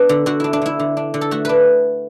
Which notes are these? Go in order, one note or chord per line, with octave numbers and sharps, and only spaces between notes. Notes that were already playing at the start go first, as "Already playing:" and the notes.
Already playing: B3 D4 B4
D3
D3 F#4
D4 E4
D4
D3 E4
D3
D4
D3
A4
A3 F#4
D4 B4